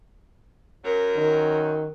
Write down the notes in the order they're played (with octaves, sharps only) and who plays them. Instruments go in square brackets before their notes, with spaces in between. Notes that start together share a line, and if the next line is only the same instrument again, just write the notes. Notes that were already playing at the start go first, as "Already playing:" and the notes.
[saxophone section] F#2 F#3 C#4 [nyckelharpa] A#4
[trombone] D#3